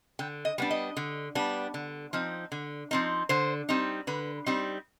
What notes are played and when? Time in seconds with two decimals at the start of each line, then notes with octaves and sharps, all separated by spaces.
0.19 D3 G5
0.45 D#5
0.58 G3 B3 D4
0.71 D#5
0.97 D3
1.35 G3 B3 D4
1.74 D3
2.13 F3 C4 D#4
2.52 D3
2.91 F3 C4 D#4
3.29 D3 C5
3.69 G3 C4 D#4
4.07 D3 B4
4.46 G3 C4 D#4